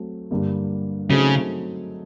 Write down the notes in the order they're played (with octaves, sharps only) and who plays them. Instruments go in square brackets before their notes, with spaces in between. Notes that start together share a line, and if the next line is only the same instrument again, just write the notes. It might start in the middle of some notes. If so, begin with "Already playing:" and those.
Already playing: [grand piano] F#3 A3 C4
G2 D3 G3 A#3
[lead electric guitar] C#3 [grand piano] F#3 A3 C4 D#4 G#4